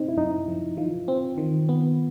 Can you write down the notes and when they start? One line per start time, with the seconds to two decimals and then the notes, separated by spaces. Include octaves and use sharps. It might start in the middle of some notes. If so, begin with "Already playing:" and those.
Already playing: C4 D#4
0.09 E4
0.17 F#2 D#4
0.48 F3
0.77 E3 F4
1.08 C4
1.38 D#3
1.69 B3